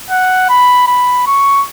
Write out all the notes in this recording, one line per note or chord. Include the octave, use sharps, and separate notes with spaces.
F#5
B5
B5
C#6